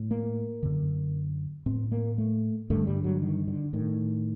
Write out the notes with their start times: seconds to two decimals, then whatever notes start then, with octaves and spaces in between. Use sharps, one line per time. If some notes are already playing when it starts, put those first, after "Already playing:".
Already playing: A2
0.11 A#3
0.63 F#2 D3
1.66 A2 C4
1.92 A#3
2.18 A3
2.70 G2 D3 A3
2.87 G3
3.04 F#3
3.22 D#3
3.48 D3
3.73 A2 D#3